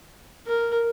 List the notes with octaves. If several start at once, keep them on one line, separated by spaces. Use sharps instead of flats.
A#4